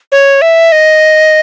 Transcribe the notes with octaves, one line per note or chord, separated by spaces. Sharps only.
C#5
E5
D#5